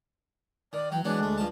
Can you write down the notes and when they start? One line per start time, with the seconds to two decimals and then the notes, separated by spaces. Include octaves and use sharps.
0.73 D#3 D5
0.92 E3 F#3 G5
1.05 E3 F#3 G#3 B3 D4
1.20 D2 A3
1.38 G2 F3 A5